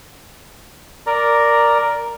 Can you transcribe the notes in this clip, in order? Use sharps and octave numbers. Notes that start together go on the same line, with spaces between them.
A#4 D5 A#5